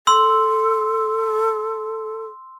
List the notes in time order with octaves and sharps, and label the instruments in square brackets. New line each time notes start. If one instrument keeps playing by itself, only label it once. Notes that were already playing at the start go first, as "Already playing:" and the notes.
[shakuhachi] A4 [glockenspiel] C6 E6